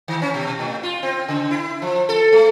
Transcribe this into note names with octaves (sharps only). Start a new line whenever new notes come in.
D#3
C#4
B2
A2
F4
C4
C#3
E4
F3
A4
A3